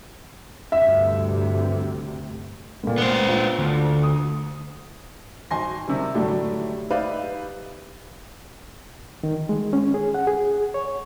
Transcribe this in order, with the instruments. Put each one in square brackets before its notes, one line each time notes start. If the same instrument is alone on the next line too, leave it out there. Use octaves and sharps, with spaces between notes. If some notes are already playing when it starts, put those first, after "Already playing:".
[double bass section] D2 G2 C3 [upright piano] E5
[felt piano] C#2 A#2
[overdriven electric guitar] B3 C5
[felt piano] D4 F4
[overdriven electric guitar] D2
[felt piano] D#6
[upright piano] G#1 G#5 C6 A#6
C3 D#3 G3
A2 D3 F#3 G3 A3 D4
D#4 G4 B4 D5 E5 F5
[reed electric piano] D#3
G#3
C#4
G#4
F#5
G#4
C#5